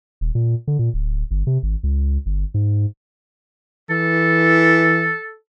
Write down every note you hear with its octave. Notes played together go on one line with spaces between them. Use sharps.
D#1
A#2
D3
A#2
D1
G1
C3
G#1
C#2
G1
G#2
E3 A4